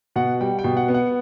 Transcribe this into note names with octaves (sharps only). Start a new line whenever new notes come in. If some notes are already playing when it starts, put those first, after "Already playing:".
B2 F#5
G3 G5
G5
B2
F#5
B3
F#5